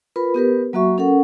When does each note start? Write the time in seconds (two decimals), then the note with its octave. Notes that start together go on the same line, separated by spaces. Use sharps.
0.16 F4 A#4 B4 B5
0.34 B3 G4 A#4 B4
0.73 F#3 A#3 F#4 E5 C#6
0.98 C#4 A4 A#4 F#5